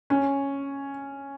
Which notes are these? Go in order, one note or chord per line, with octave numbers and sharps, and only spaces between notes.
C#4